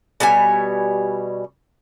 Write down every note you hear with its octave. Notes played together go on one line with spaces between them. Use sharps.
B2 G3 C#5 G#5